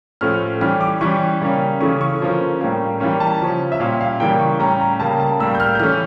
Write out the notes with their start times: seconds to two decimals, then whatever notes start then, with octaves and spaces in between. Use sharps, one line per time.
0.21 A2 F3 A3 C#4 F6
0.61 E3 G3 C#4 F6
0.81 D6
1.01 E3 G3 C#4 C#6
1.41 C#3 G3 A#3 C#4
1.80 C#3 E3 A3 C#4 C#6
2.01 C#6
2.20 D3 F3 A#3 C#4
2.61 A2 G3 A#3 C#4
3.00 E3 G3 A#3 C#4 C#6
3.20 A5
3.41 C#3 F3 C#4
3.72 E5
3.80 A#2 G3 C#4 F5
4.01 F5
4.20 C#3 E3 G3 A#3 G5
4.40 C#6
4.60 A2 G3 C#4 A#5
4.80 A#5
5.00 C#3 G3 A#3 A5
5.20 A5
5.39 A2 G3 A#3 E6
5.55 G6
5.60 F6
5.75 G6
5.80 E3 A3 C#4 F6